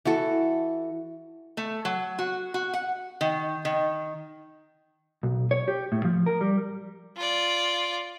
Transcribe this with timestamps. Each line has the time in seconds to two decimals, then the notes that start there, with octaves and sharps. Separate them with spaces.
0.05 E3 F#4 A4
1.57 A3
1.85 F#3
2.19 F#4
2.54 F#4
2.74 F#5
3.21 D#3
3.65 D#3
5.23 B1
5.51 C#5
5.68 G4
5.92 A2
6.05 F3
6.26 A#4
6.41 G3
7.17 F4 D5